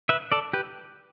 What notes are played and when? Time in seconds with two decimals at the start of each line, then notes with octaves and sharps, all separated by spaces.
0.09 B4 E5
0.32 A4 D5
0.53 G4 B4